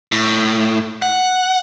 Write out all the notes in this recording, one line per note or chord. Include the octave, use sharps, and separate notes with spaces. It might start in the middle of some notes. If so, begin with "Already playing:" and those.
A2
F#5